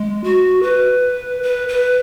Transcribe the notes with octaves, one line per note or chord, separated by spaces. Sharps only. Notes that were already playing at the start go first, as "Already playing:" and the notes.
Already playing: G#3
F#4
B4
B4
B4